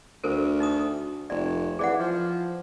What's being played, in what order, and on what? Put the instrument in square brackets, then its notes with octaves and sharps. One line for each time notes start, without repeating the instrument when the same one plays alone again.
[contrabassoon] D2 [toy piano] A4 A#4 C5
[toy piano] D#4 A#5 D#6
[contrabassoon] F1 [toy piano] D5
[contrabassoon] E3 [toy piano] G#4 D5 F#5
[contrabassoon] F3